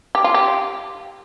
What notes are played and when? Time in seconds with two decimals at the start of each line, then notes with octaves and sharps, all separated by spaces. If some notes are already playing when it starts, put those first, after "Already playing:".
0.15 G4
0.24 F4
0.34 G4